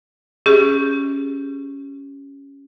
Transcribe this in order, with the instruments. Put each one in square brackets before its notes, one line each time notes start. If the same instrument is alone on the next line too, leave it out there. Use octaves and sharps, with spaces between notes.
[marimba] C#4 G4 [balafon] G#4